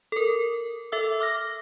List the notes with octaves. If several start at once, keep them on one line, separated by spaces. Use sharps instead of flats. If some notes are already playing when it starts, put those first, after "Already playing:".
A4 A#4
A4 E5 E6
D6 F6 A#6